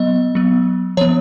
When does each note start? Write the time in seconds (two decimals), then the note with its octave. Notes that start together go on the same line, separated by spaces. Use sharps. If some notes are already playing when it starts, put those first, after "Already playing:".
Already playing: F#3 B3 D#5
0.35 F#3 B3
0.97 F3 B3 C#5